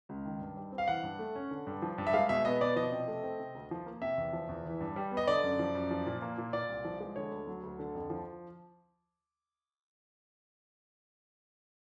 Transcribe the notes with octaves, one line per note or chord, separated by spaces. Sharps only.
C#2
D#3
G2
G3
C4
F5
E3 F#5
G2
A3
C#4
D3
G2
F3
G2
E5
G#3 F5
B2 E5
B3 D#5
B2 D5
F3 D#5
C3
A3
C4
C3
D2
F3
A#3
C3 E5
E2
F3
E2
E3
G2
G3
B3
D#5
D3 D5
F#2
F3
F#2
F3
A#2
A#3
A#2
A#2 D5
C2
F3
G#3
D3 C#5
D2
F#3
D2
D3
F2
F3